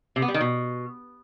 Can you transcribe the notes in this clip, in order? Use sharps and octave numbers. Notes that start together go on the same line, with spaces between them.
C3
B3
G3
D#3
B2